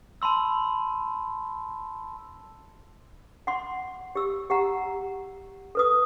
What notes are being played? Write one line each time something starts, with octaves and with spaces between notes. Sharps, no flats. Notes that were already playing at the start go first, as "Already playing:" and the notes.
A5 B5 C6 E6
F#5 C6
G4 E6
G4 F#5 A#5
A4 B4 D#6